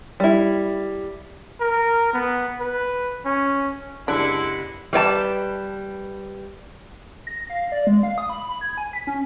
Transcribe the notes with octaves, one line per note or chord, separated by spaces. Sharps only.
G3 E4
A#4
B3
B4
C#4
F#1 C3 G#3 D4 E4 F#5
G3 B4 D5 A5
A#6
F5
D5
G#3
F5
D#6
B5
B5
G#6
G#5
B6
C#4